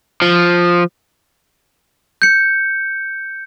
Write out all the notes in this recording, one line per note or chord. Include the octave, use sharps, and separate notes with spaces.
F3
G6 C#7